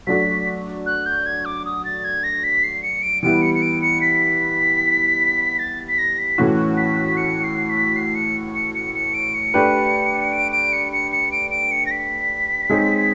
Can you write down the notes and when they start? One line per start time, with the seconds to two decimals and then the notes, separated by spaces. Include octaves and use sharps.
0.07 F#3 A3 D4 F#4 B6
0.86 F#6
1.06 G6
1.26 G#6
1.45 D6
1.65 D#6
1.85 A6
2.04 G#6
2.24 A#6
2.44 B6
2.64 C7
2.83 C#7
3.03 D7
3.23 E3 G3 B3 E4 D7
3.42 C#7
3.55 C#7
3.62 D7
3.82 C#7
4.02 B6
5.59 A6
5.88 B6
5.98 A#6
6.19 B6
6.38 A2 E3 A3 C#4 F#4
6.77 B6
7.17 C#7
7.44 C7
7.70 B6
7.96 C7
8.15 C#7
8.55 C#7
8.75 C#7
8.95 C#7
9.14 D7
9.35 C#7
9.54 A3 D4 G4 B4
10.33 D7
10.52 D7
10.73 C#7
10.92 C#7
11.12 C#7
11.32 D7
11.51 D7
11.71 C#7
11.86 A#6
11.91 B6
12.70 G#3 C4 D#4 G#4 C#5